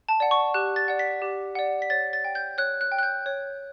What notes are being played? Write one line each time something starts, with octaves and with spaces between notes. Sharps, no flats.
A5
D5 F#5
C#6
G4 F#6
A6
D5 F#5
B6
G4
D5 F#5
B6
C#5 A6
A6
G5
G6
C#5 F#6
F#6
G5
F#6
G6
C#5